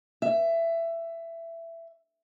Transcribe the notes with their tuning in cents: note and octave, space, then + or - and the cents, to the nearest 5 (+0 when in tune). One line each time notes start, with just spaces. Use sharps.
E5 +15